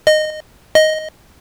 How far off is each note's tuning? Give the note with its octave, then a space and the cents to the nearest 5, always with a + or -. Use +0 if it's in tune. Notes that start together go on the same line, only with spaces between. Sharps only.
D#5 -15
D#5 +5